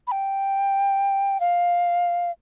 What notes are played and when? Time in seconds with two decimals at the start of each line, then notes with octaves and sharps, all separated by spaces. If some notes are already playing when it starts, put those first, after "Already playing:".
0.07 B5
0.12 G5
1.40 F5